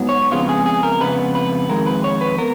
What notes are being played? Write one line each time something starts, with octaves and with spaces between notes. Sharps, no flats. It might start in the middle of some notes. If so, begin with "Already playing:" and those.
Already playing: G#2 F#3 B3
C#5
F2 C#3 G#3 B3 F4
G#4
G#4
A#4
F2 C#3 G#3 B3 B4
B4
F2 D#3 G#3 A#4
B4
C#5
B4
B3 A#4